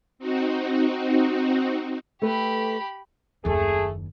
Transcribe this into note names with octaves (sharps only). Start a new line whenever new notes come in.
C4 D#4 F#4
A3 G4 A4 B4 B5
F#1 D#2 A3 G#4 A4